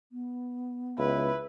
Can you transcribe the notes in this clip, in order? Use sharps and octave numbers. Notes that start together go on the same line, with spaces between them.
B3
C#2 E4 B4